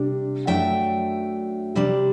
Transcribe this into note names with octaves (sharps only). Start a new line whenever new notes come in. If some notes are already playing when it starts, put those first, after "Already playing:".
Already playing: C3 G3 D4
F#2 F#3 A3 D4 E5 G5
C3 G3 D4